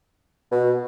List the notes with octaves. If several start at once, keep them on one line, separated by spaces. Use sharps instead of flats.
B2